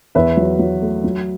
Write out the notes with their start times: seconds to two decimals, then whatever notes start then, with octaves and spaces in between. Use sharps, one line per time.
0.15 E2 B4 E5
0.37 F#3
0.59 F#3
0.82 A3
1.04 F#3